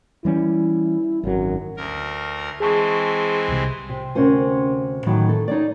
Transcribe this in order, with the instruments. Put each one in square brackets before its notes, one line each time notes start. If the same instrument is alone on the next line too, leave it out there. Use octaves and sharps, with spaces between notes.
[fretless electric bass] E3 G3 C#4 [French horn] E4
[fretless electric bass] G#1 C#3 F#3 [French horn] F#2
[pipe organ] D2 A#4
[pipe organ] E3 G#3 C4 [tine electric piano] G#4 A5 C#6
[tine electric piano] C2 C3
[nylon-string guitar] C3
D2 C3 C#4 A#4 C5 G#5
A2 D#3 E3 F#3
A4
D#4 C#5 D5